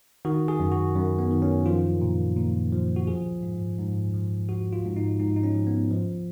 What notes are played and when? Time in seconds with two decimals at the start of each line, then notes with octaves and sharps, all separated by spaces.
0.25 D#3 F#4
0.48 G#4
0.60 F#2
0.72 F#4
0.96 F#2
1.19 B3
1.31 D#3
1.42 C#4
1.66 F3 F4
2.01 A#2
2.36 A#2
2.72 F3
2.96 F#4
3.07 F3 G#4
3.43 G#2
3.78 G#2
4.14 F3
4.49 F3 F#4
4.73 F4
4.85 G#2
4.96 D#4
5.19 G#2 D#4
5.36 D#4
5.43 C#4
5.55 F3
5.67 B3
5.91 F3